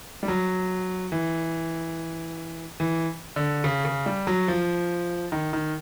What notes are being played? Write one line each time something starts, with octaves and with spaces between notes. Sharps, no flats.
G3
F#3
E3
E3
D3
C#3
C#3
G3
F#3
F3
D#3
D#3